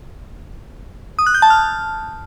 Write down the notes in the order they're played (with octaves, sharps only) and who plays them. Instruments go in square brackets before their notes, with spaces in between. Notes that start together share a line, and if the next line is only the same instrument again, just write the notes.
[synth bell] D#6
F#6
G6
A5
F6